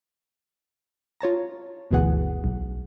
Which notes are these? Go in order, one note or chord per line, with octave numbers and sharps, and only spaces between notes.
F4 C#5 A5 A#5
G1 D2 B2 E3 G#4 F#5
B1